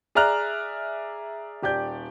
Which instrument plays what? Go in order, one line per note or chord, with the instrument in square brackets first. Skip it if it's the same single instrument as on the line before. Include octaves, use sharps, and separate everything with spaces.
[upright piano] G#4 D5 E5 A#5 F6 F#6
D#1 G4 D5 G6